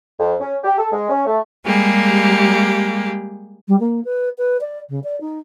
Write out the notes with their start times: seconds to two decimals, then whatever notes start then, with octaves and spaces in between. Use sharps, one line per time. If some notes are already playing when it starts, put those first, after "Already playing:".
0.19 F2
0.40 C#4
0.64 G4
0.78 A4
0.92 G#3
1.09 C#4
1.26 A3
1.66 G3 G#3 A#3 G4 G#4
3.68 G3
3.80 A#3
4.05 B4
4.38 B4
4.61 D5
4.89 C#3
5.04 D5
5.21 D#4